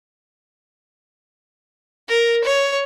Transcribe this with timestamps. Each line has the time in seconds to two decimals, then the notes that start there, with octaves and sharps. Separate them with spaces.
2.08 A#4
2.44 C#5